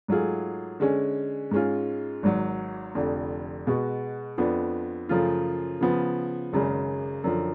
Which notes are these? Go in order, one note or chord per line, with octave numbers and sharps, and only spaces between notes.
G#2 F#3 A3 F4 G#4
D3 G#3 C#4
G#2 G#3 C#4 F4
G#1 G#2 F#3
F1 F2 D3
B2 G#3 B3 F#4
F2 F3 B3 D4
F#2 C#3 F3 A3 F4
C#3 F3 B3
G#1 F#2 C#3 G#3
F#2 D3 F3